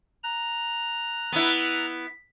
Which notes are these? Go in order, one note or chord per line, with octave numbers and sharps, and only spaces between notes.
A#5 F#6
B3 E4